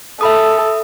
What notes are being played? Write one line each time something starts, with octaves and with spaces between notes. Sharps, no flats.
A4 E5 B5 D#6